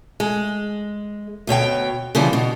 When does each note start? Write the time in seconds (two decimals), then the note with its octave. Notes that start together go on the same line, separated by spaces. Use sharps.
0.20 G#3
1.47 D2 B2 C#5 G5
2.15 C#3 E3 F3 G3
2.33 B2